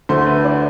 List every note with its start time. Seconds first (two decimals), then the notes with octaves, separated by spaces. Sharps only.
0.09 D2 D3 A3 C5
0.26 B4
0.44 D4